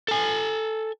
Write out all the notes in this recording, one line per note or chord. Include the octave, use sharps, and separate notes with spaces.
A4 G#5